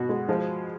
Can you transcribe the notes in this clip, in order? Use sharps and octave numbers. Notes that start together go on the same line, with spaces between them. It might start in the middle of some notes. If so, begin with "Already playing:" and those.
Already playing: B2 F#4
G#3
F3 G#3